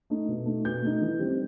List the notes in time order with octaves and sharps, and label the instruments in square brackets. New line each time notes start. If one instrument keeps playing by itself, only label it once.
[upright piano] A3 D#4
B2
A3 D#4
B2 G6
A3 D#4
E3
G3 C4 D#4